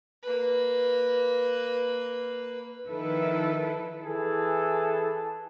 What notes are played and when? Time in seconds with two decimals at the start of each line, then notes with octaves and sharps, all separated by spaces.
0.23 A#3 B4
2.87 D#3 F3 E4 A4 B4
4.04 E3 G#4 A4